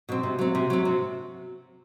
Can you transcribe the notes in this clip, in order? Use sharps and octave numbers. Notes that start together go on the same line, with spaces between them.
B2 F#3 C4
C3
F#3 C4
C3
F#3 C4
C3